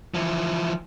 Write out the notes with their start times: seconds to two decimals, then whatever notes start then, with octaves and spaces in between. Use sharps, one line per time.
0.14 E3 F3